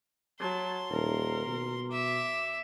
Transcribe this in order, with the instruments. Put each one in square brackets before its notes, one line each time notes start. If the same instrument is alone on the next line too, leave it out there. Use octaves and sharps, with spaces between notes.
[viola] F#3 A5 [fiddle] C6
[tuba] D#1 [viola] A#4
[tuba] B2
[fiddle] E5 [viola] D6